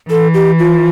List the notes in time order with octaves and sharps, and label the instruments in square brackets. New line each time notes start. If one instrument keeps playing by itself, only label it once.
[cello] E3 [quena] A4
[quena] G4
F4